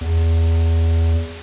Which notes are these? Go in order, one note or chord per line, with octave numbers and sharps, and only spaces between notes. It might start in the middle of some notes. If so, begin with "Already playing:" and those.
E2